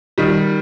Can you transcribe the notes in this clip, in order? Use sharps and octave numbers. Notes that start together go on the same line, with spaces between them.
D#3 G3